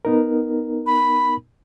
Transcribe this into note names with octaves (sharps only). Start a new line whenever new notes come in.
B3 D#4 A#4
B5